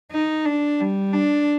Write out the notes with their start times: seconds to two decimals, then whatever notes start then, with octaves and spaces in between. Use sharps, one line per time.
0.12 D#4
0.45 D4
0.80 G3
1.13 D4